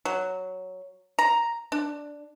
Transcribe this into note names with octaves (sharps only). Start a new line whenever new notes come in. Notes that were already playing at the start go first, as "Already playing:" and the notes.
F#3
A#5
D4